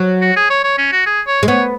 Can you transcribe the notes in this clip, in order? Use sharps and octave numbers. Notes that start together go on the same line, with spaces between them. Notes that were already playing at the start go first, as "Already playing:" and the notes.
Already playing: F#3
F#4
G#4
C#5
C#5
C#4
F#4
G#4
C#5
G#3
B3 C#5